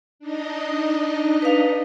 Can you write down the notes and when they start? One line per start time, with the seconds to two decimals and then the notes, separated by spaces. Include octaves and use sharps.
0.19 D4 D#4 D#5
1.42 B4 F5